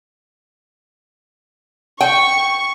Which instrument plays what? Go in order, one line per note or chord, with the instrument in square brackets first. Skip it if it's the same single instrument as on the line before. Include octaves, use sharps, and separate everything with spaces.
[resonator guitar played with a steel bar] G5 [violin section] C#6